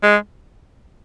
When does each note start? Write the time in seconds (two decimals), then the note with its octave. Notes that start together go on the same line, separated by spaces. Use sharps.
0.03 G#3